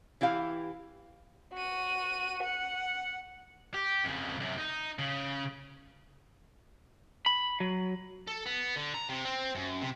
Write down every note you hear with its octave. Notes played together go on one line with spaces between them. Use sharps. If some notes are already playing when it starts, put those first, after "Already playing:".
E3 E4 G4 F5
F#4 D#7
F#5
G4
F2 C#3
F#2 C3
D#4
C#3
B5
F#3
A4
B3
D3
A#5
C3
C4
F#2
C3